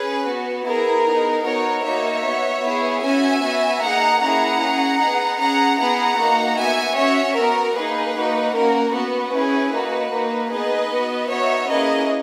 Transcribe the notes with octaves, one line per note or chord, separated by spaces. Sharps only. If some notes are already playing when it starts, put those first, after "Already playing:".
Already playing: C#4 G#4 B4
B3 F#4
B3 E4 G#4 A#4
B3 D#4 G#4
B3 D#4 F#4 A#4 C#5
A#3 D#4 F#4 C#5 E5
B3 F#4
B3 E4 G#4
C#4 F#4 E5 G#5
B3 F#4
A#3 D#4 G#4 F#5 A#5
A#3 C#4 E4 G#4 F#5 A#5
C#4 G#4
B3 D#4 G#4
C#4 G#4 F#5 A#5
B3 E4 G#4 F#5 A#5
A#3 D#4 F#4
B3 F#4 E5 G#5
C#4 F#4 C#5 E5
B3 F#4 A#4
A#3 D#4 G#4 B4
A#3 D#4 F#4
A#3 C#4 F#4 A#4
B3 F#4 B4
C#4 E4 G#4
A#3 D#4 F#4
A#3 D#4 F#4
B3 D#4 G#4 B4 D#5
B3 F#4
B3 D#4 F#4 C#5 E5
A#3 C#4 E4 G#4 B4 D#5